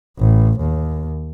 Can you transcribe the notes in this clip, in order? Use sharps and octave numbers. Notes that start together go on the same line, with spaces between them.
A1
D#2